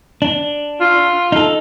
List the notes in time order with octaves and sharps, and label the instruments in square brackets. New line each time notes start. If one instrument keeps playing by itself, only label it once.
[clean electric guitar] D4
[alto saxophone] F4
[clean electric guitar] D#4 A4